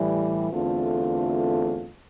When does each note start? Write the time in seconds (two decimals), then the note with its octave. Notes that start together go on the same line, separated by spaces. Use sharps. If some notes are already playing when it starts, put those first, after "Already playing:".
Already playing: A2 E3 G3
0.52 E2 D3 A3 C4 F4